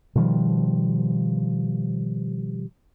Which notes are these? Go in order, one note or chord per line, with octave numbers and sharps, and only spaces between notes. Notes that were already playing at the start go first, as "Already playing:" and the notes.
B2 D#3 F3 G3